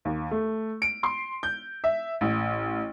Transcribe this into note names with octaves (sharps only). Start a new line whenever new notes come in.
D#2
A3
D7
C6
G6
E5
A1